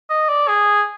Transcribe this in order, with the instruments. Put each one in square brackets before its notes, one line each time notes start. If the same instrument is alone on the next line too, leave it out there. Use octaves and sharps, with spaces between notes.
[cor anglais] D#5
D5
G#4